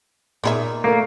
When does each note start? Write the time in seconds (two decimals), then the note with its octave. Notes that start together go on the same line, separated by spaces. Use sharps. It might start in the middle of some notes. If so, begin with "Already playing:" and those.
0.44 A#2 B3 D#4 G#4 E5
0.84 A3 A#3 A4 A#4